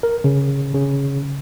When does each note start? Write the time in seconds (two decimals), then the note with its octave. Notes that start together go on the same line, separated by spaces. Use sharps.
0.03 A#4
0.24 C#3
0.74 C#3